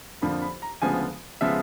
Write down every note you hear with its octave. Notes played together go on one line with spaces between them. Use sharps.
F2 D3 F3 A#3 B5
B5
A#5
D2 C#3 F3 G#3 B3 G#5
C#3 F3 G#3 B3 E5